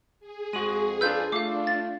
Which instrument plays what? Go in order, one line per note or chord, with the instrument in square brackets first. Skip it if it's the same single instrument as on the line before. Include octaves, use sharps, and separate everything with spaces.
[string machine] G#4
[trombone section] F2 [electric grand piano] G#3 F#4 [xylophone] D#7 F#7
[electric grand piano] D4 F4 B4 [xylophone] E6 G6
[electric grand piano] A3 C7 [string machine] D4 [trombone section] F4 [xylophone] F5 D6
[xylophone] A6